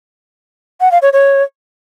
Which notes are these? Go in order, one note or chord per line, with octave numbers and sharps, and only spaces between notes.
F#5
F5
C#5
C#5